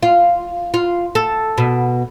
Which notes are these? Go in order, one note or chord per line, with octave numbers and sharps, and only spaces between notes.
F4
F4
A4
B2